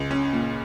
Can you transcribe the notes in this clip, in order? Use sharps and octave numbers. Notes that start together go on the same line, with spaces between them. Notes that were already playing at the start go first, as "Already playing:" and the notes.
Already playing: C#2
C#4
A#2